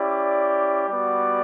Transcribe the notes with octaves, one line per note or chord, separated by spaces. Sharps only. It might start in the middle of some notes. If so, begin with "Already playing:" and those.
Already playing: C#4 E4 G4 D5
G3 B3 F#4 D5